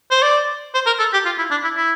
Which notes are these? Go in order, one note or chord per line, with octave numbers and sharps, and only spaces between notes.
C5
D5
C5
A#4
A4
G4
F4
E4
D4
E4
E4